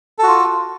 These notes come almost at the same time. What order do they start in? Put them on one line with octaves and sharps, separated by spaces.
A4 F#4 F4